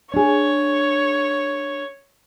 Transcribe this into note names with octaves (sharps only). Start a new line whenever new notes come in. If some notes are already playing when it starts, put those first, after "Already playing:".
D4 G#4 C#5